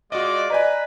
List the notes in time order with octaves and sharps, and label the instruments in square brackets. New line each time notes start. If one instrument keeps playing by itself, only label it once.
[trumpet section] G#3 F4 D5 [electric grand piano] F#4 D#5
[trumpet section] B4 [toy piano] D5 D#5 [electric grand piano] G#5 A#5